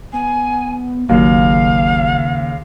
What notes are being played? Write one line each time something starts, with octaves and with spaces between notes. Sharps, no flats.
B3 G#5
G#1 D#2 C#3 F#3 A#3 F5